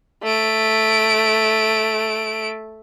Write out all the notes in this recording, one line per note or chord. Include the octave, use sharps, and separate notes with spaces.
A3 D7